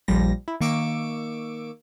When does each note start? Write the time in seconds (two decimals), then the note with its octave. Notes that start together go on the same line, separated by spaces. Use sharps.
0.08 A#1 F3 G3 A#6
0.48 E4
0.60 D#3 A#3 C#6 D6 E6 D7